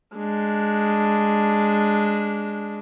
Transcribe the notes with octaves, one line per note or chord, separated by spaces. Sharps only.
G#3 D4